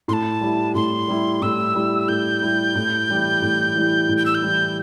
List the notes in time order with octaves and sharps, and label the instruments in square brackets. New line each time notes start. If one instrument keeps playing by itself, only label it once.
[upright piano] A2 [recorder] C6
[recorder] A5
[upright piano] G3 E4
[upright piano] A2 [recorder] C6
[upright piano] G3 E4
[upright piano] A2 [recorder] E6
[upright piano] G3 E4
[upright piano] A2 [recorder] G6
[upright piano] G3 E4
A2
E3 G3 E4
A2
E3 G3 E4
A2
[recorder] G6
E6
G6
[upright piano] E3 G3 E4